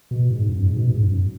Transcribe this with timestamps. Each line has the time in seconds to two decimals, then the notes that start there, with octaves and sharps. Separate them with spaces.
0.11 B2
0.30 G#2
0.50 F#2
0.63 G#2
0.76 B2
0.89 G#2
1.02 F#2